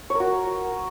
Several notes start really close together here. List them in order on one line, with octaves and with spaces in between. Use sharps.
C#5 A#4 F#4